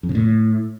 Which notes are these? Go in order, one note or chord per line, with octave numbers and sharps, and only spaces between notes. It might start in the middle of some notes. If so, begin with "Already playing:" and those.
F2
C#3
A2